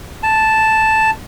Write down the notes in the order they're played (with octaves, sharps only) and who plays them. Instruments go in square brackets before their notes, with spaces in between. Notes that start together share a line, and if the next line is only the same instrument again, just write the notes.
[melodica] A5